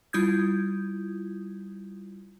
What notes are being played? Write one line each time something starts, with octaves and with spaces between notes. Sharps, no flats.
G3 E4 F4 D#6 G6 G#6